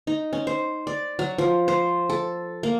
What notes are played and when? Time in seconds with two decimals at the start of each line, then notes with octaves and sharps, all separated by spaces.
0.07 D#4
0.33 C#4
0.47 C5
0.87 D5
1.19 F#3
1.38 F3
1.68 C5
2.10 A4
2.63 A#3